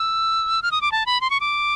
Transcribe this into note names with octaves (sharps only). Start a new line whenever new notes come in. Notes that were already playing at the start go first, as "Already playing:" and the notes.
Already playing: E6
F6
D#6
D6
A5
B5
C6
C#6
D6